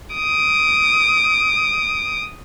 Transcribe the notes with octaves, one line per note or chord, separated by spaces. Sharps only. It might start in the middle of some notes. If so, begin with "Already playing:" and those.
D#6 D7